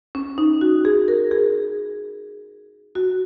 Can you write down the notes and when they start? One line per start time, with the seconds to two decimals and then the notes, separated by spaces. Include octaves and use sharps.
0.15 C#4
0.38 D#4
0.61 F#4
0.85 G#4
1.08 A#4
1.31 G#4
2.95 F#4